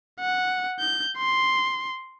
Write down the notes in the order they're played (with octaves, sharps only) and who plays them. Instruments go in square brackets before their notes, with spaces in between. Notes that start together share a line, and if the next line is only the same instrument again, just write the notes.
[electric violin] F#5
G6
C6